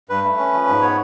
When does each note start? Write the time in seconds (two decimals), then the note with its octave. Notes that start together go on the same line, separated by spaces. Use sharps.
0.09 G2 B4
0.23 A3
0.38 C#4
0.53 F3
0.67 G#2
0.82 B3 C#5